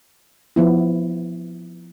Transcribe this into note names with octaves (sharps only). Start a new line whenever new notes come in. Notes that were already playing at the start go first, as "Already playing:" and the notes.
F3 B3 E4